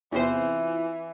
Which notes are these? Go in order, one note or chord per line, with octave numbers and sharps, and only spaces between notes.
E2 C3 E3 C4 E4 F4 C5